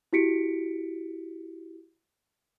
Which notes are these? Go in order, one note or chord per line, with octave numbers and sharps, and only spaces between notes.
E4 F#4 G4 B6 C#7 D7